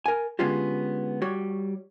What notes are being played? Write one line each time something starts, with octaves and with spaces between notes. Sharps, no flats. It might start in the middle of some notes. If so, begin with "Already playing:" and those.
A#4 G#5
D3 G#3 B3 C#4 F4 G4
G3 F#4 C#5